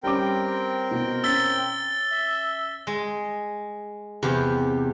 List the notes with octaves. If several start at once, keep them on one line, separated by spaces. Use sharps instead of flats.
G3 C4 C#4 A#4 G5 D6
B2
C#4 E6 A6 B6 G7
E5
G#3
E2 C3 G4